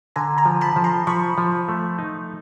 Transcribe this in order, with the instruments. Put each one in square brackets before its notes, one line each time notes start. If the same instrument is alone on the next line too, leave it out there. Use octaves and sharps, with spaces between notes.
[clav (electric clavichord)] D3 [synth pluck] G#5 A#5
[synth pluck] G#5 A#5
[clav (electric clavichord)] F3
[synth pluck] A5 B5
[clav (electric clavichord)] F3
[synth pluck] A#5 C6
[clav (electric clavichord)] F3 [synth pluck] B5 C#6
[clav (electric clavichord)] F3
A3
D#4